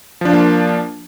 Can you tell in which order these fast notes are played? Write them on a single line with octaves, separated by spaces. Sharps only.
F3 D4 F4 A#3